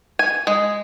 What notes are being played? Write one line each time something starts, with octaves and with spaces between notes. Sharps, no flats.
G#5
G#3